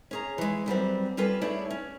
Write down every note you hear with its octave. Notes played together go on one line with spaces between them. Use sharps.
C#4 G#4 A#5
E3 G#3
F#2 G3 B3 C4
G3 C#4 F4 A4 B4
A3 B3 D4 E4 G#4 C#5
C#4